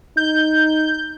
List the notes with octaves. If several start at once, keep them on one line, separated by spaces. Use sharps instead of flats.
D#4 G6